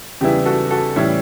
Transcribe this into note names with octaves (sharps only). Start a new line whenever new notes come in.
E2 C#3 G3 B3 E4 G4
F#4 A4
F#4 A4
A2 E3 G3 C#4 E4